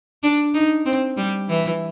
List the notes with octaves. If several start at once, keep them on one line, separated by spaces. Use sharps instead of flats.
D4
D#4
C4
G3
E3